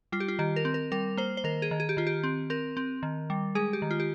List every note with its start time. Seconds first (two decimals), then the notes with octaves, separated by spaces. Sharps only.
0.12 G3 F4
0.20 G4
0.28 F4
0.39 D#3 G4
0.56 A#4
0.65 C4
0.74 A#4
0.92 G3 A#4
1.17 A#3 C5
1.37 C5
1.44 D#3 A#4
1.62 G#4
1.71 D#3
1.80 G#4
1.89 G4
1.97 D#3 F4
2.07 G4
2.23 C4
2.50 C4 A#4
2.77 C4
3.03 D#3
3.30 G3
3.55 G#3 G#4
3.73 G4
3.82 D#3
3.91 F4
4.00 G4